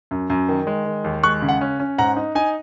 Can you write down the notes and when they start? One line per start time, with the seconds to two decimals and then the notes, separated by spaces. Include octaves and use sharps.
0.11 F#2
0.30 F#2
0.49 D#3
0.67 G#3
0.85 D#3
1.04 D#2
1.23 G#3 C#6 F#6
1.42 C#3
1.49 F#5
1.61 C#4
1.80 C#4
1.98 G#2 F#5 A#5
2.16 D#4
2.35 D#4 G#5